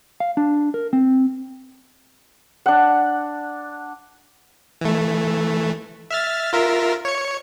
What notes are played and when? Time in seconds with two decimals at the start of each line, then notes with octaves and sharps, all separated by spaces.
0.20 F5
0.37 D4
0.74 A#4
0.93 C4
2.66 D4 F#5
4.81 E3 A3
6.11 E5 F6 A6
6.53 F4 A#4 E5
7.05 C#5 C#7